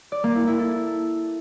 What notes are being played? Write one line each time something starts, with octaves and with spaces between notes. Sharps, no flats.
D5
A#3
E4
E4
A4